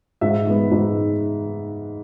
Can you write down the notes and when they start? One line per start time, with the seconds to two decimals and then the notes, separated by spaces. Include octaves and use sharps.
0.21 G#2 E5
0.47 G#3 B3
0.72 G#2